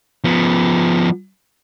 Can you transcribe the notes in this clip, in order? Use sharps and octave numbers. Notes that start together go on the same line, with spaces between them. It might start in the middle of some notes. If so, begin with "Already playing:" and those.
F3 B3